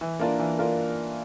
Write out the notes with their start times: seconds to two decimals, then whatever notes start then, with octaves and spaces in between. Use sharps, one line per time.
0.01 E3
0.19 A#3 D4 F4 A#4
0.39 E3
0.59 A#3 D4 F4 A#4